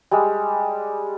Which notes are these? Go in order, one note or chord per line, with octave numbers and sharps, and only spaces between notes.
G3 G#3